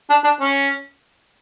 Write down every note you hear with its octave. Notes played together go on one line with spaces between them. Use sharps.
D4
D4
C#4